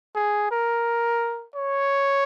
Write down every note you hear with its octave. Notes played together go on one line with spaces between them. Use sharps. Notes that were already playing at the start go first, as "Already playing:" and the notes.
G#4
A#4
C#5